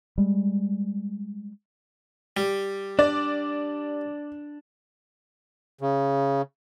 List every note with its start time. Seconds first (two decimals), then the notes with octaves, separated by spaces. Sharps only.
0.18 G3 G#3
2.37 G3
2.99 D4 D5
5.81 C#3